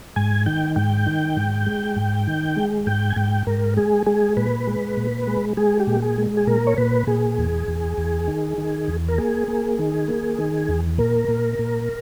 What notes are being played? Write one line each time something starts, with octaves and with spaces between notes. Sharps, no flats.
G#2 G#5
D#3 G5
G#2 G5
D#3
G#2
G#3
G#2
D#3
G#3
G#2 G5
G#5
G#2 G5
G#2 A#4
G#3 G#4
G#3 G#4
A#2 B4
G#3
A#2
G#3
G#3 G#4
G4
A#2
G#4
G#3
G#4
A#2 A#4
C#5
A#2 B4
A#2 G#4
E2
E2
E2
D#3
D#3
E2
A#4
A#3 G#4
A#3
D#3
A#3
D#3
E2
A#2 A#4
A#2
A#2